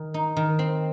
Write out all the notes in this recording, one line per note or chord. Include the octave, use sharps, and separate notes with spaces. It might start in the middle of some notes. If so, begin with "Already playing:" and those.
Already playing: D#3
D#4
D#3
C4